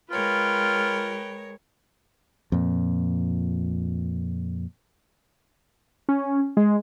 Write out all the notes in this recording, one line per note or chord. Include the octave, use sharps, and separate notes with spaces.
G#3 F4 A#4 B4 C#5 G5
F2 A#2
C#4
G#3